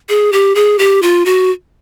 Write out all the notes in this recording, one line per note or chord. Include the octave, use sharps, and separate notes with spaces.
G#4
G4
G#4
G4
F4
F#4